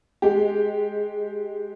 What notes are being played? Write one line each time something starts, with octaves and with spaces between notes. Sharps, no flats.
G#3 G4